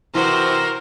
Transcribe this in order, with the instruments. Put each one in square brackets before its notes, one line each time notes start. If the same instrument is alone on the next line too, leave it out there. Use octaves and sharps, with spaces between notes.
[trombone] C3 [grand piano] E3 [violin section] F#4 C5 [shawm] A#4